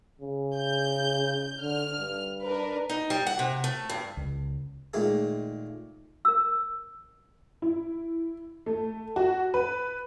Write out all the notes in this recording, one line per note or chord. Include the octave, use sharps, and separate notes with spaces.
C#3
G6
D3 F6
G2
D4 A#4 B4
D#4
G3
F#5
C3
A3
G2
C#2
A#2 D#3 G#3 A3 G#4
A#4 E6
E4
A3
F#4
B4